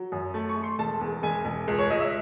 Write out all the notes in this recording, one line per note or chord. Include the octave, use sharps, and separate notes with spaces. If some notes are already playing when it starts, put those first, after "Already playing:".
Already playing: F#3
F#2
A3 A5
C#6
A3
C6
E1 A5
E2
E1 G#5
E1
C#2
C#5
C#2 D#5
E5